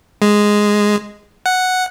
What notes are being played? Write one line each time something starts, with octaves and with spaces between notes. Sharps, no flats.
G#3
F#5